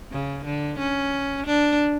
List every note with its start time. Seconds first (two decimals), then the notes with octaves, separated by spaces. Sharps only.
0.11 C#3
0.45 D3
0.79 C#4
1.46 D4